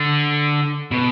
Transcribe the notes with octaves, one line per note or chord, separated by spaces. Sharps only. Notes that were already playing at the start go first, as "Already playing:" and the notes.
Already playing: D3
B2